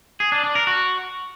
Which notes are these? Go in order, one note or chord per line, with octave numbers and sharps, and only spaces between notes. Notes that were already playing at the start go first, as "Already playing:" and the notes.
G#4
D4
D4
A#4
F#4